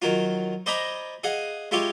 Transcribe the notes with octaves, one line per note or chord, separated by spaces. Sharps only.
D#3 F#3 F4
C5 D5 D#5 G#5 A#5 B5
G#4 D#5 F5 F#5
G#3 E4 F4 G4 C#5 F5